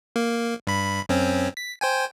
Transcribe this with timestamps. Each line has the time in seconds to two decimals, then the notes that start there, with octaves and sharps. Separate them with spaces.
0.16 A#3
0.67 G2 B5
1.09 F#2 C4 C#4
1.57 B6
1.81 C5 G5 G#5